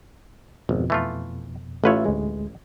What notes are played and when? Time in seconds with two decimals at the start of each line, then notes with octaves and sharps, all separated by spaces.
0.69 G#1 F2 B2
0.90 E3 A3 F4
1.84 A1 A3 F4 B4 C#5 E5
2.06 D2 G#3